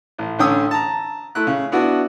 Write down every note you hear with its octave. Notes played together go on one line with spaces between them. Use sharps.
A1
A1 D3 C#4 G5 D#6 E6
A5 A#5
A3 E4 F#6
C#3
B3 D4 E4 F#4